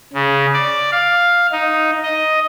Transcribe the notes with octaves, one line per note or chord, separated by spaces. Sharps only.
C#3
D5
F5
D#4
D#5